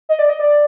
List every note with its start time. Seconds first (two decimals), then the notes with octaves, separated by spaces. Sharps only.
0.09 D#5
0.19 D5
0.29 D#5
0.39 D5